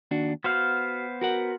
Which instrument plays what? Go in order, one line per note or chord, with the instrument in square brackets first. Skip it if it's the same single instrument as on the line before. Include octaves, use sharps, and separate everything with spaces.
[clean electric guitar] D#2 D4 F#4
[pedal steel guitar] B3 C5 F5 [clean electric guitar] F#4
[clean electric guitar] F#4 A#4 F#5